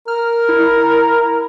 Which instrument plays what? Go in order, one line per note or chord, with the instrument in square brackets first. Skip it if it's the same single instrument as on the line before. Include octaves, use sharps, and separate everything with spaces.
[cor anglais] A#4 [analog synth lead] F6
[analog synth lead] E4